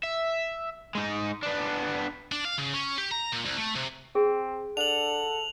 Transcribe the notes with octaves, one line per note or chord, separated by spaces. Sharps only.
E5
G#3 D#4
B3 D4
D4
F5
C#3
C#4
G4
A#5
A#2
C2
A3
C3
C4 G#4
D4 A4 F#5 F7 F#7